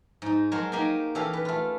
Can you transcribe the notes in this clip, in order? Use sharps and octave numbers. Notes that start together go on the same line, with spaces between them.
G#2 D#4
F#3 G#3 A#4 C5 C#5 A5
A#3 D#4 G4 G5 G#5
E3 C#4 G4 A4 F5
B4
A3 F4